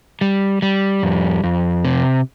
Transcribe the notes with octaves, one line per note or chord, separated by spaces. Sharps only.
G3
G3
F2
F2
C3